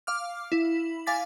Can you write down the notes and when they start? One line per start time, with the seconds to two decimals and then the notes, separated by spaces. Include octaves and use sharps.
0.07 F5 D6 F6
0.52 E4
1.06 F5 G#5 D6 A6 B6